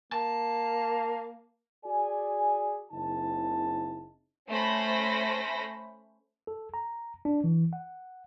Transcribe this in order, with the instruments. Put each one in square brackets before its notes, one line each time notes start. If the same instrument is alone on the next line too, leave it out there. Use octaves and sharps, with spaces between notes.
[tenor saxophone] A#3 [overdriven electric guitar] A5
[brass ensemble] F#4 G#4 D5 G#5
F#1 C#3 C4 D#4 E4 A5
[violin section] A3 C#4 C5 B5 A#6
[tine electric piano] A4
A#5
D4
E3
F#5